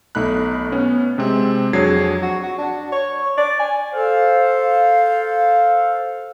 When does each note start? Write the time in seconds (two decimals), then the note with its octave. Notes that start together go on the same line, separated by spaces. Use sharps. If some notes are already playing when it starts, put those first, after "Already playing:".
0.15 B1 A3 D#4 B5 F#6
0.72 B3 C#4
1.18 C3 G#3 C4
1.73 F2 F#3 D4 G#4 G#6 C7
2.22 F#4
2.43 F#4
2.58 D4
2.92 C#5
3.37 D5
3.59 G#5
3.93 A4 C5 F5